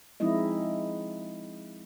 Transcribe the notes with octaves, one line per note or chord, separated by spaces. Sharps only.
F3 G#3 C4 D#4 E4 D#5